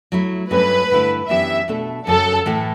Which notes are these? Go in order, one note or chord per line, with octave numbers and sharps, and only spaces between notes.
F#3 A3 E4
G2 F#3 A3 C#4 B4
G2 D3 A3 E4
F#2 E3 B3 D4 G4 E5
B2 A3 D4 A4
F#2 C#3 F#3 A4
A2 E3 A3 E4 A4